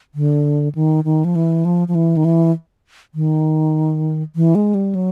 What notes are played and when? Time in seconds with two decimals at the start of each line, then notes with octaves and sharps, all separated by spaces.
0.15 D3
0.75 D#3
1.04 D#3
1.25 F3
1.36 E3
1.65 F3
1.88 F3
1.95 E3
2.17 D#3
2.25 E3
3.15 D#3
4.36 E3
4.55 G#3
4.75 G3
4.95 F#3